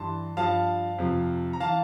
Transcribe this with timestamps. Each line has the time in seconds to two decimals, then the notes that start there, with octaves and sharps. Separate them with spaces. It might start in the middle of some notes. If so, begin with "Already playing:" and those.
Already playing: G2 E3 A5 C6
0.37 G2 F3 F5 A5
0.98 F2 C3 F3
1.53 A#5
1.60 E3 F5 A5